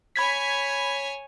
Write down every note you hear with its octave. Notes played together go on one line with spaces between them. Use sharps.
C#5 G#5 B5 G#6 B6